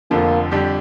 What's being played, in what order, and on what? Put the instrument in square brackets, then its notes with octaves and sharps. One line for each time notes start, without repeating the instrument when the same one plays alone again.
[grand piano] F1 F2 D3 F3 [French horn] A#3
[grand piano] F2 D3 G3 D4 G4